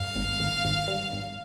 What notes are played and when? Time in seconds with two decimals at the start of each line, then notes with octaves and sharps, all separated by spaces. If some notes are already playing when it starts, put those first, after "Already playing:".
Already playing: G2 F5
0.16 G#1
0.40 G#1
0.65 G#1
0.88 G2
1.13 G#1